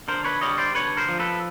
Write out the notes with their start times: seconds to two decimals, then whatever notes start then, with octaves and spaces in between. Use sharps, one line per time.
0.08 D3 A#4 C5
0.25 B4 C#5
0.41 G3 C#5 D#5
0.58 C5 D5
0.75 D3 B4 C#5
0.97 A#4 C5
1.09 F3
1.20 A4 B4